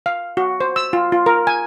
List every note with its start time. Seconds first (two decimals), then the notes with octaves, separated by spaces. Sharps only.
0.06 F5
0.37 F#4
0.61 C5
0.76 E6
0.93 F4
1.12 F4
1.26 A#4
1.47 G#5